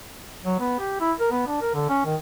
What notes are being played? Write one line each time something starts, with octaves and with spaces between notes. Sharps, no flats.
F#3
B3
G4
E4
A#4
B3
D4
A#4
D3
C#4
D#3